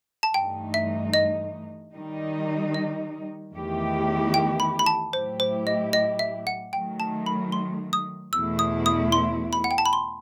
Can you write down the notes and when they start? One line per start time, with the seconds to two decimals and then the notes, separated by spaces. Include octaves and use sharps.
0.23 A5
0.34 G2 E3 A3 D#4 G5
0.74 E5
1.14 D#5
1.94 D#3 G3 D#4
2.74 D#5
3.54 E2 D#3 A3 E4 G4
4.34 G5
4.60 B5
4.79 B5
4.86 A5
5.13 A2 F#3 A3 E4 G4 C5
5.40 C5
5.67 D#5
5.93 D#5
6.19 E5
6.47 F#5
6.73 D#3 F#3 A3 G5
7.00 A5
7.26 B5
7.52 C6
7.93 D#6
8.33 E2 B2 A3 E4 E6
8.59 D#6
8.86 D#6
9.12 C6
9.53 B5
9.64 F#5
9.71 G5
9.78 A5
9.86 B5
9.93 C6